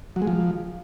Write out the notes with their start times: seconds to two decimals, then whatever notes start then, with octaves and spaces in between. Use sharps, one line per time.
0.16 F#3
0.22 G#3
0.27 F3